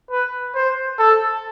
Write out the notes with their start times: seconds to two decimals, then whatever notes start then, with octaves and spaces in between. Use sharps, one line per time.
0.11 B4
0.55 C5
0.99 A4